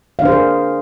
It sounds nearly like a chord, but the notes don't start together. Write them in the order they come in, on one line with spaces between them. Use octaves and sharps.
F5 D4 C5 G#4 A#4